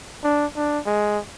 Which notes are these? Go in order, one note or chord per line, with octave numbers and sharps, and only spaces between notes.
D4
D4
G#3